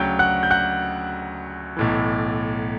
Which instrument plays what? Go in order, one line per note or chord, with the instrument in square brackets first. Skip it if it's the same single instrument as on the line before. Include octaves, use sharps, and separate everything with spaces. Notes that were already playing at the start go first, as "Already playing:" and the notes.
Already playing: [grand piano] D2 C#3 F#3 G5 G6
F#5 F#6
G6
F#5 F#6
B1 A2 E3